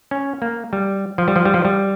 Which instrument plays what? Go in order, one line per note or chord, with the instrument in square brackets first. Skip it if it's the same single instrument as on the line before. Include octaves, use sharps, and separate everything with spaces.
[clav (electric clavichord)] C#4
A#3
G3
F3
G3
F3
G3
F3
G3